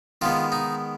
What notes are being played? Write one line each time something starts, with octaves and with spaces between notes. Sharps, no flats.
D#3 G#3 B3 F4
D#4